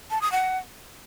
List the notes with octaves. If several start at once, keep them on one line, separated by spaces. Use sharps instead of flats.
A5
D#6
F#5